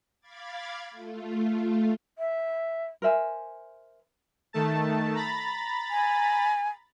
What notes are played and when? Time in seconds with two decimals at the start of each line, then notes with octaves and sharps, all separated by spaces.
0.20 F5 B5 D6 G#6 A6
0.91 A3 F4
2.18 E5
3.02 A#4 C5 E5 G#5
4.53 D#3 A3 A5
5.15 A#5 B5 A6
5.90 G#5